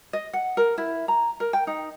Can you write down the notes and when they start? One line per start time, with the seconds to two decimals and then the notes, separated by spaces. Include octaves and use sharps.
0.13 D#5
0.33 F#5
0.57 A#4
0.78 E4
1.08 A#5
1.40 A#4
1.53 G5
1.67 D#4